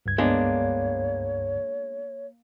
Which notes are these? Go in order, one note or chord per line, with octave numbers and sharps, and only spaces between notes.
C#2 G2 G#6
G#3 A#3 B3 D4 C#5